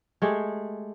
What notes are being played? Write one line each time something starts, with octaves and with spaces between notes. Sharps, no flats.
G#3 A3 G4 G#4